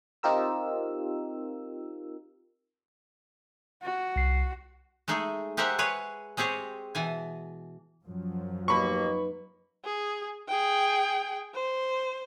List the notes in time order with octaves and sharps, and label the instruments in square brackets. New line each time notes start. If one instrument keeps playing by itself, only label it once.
[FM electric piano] C4 D#4 F4 G4 A#4 E6
[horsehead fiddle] F#4
[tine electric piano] C2 C7
[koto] G#3 A3 D#4 G#4
G#3 G4 A#4 C5 E5 F#5
G#4 B4 C#5
G#3 C4 G4 G#4 C#5
B2 E3 G#5
[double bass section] F#2 F3 F#3
[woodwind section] D#2 B2 A#3 [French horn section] D#4 B4 [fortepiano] B5 C#6
[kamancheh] G#4
G#4 G5
C5